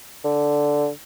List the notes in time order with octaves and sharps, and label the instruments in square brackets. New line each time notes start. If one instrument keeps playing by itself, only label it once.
[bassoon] D3